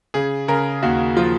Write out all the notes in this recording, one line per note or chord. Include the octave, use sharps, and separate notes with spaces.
C#3 G#4
C#3 A#4
D#2 F#4
F3 F4